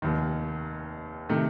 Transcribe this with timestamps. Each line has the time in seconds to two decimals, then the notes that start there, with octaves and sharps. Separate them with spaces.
0.02 F1 D#2 D#3
1.29 C3 D#3 A3